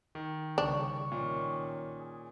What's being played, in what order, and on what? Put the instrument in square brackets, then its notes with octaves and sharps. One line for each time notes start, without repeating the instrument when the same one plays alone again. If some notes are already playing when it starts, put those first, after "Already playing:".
[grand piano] D#3
[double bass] C2 C#3 [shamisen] D4 [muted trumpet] C#6
[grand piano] A#2 [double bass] D#3 C#4
[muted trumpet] G#4